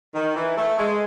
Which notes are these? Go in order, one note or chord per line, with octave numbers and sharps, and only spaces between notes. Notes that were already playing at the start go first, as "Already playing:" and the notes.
D#3
E3
A3
G#3